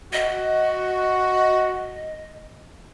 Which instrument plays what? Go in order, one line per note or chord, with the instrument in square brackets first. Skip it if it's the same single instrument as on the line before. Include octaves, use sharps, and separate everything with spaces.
[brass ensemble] F#4 [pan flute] D#5